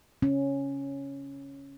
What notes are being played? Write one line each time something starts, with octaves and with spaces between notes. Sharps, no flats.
C#4